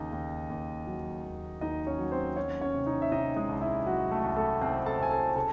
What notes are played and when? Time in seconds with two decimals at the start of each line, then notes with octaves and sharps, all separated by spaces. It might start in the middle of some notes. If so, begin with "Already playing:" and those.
Already playing: D#2 C#3 D#4 D#5
0.12 D#2
0.50 D#2
0.87 F#3
1.25 D#2
1.61 D#2 D#4 D#5
1.87 C#4 C#5
1.99 F#3
2.12 C4 C5
2.36 F#3 C#4 C#5
2.61 C#4 C#5
2.74 C3
2.86 D#4 D#5
3.02 E5
3.12 C3 D#4 D#5
3.36 G#3 G#4
3.49 C2
3.61 E4
3.86 F#3 F#4
4.11 A3 A4
4.24 C2
4.36 A3 A4
4.61 C2 C4 C5
4.86 A4 A5
4.98 C2 G#5
5.11 A4 A5
5.36 C#3 A4 A5